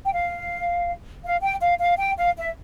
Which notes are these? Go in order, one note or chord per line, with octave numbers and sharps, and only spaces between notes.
G5
F5
F5
G5
F5
F5
G5
F5
E5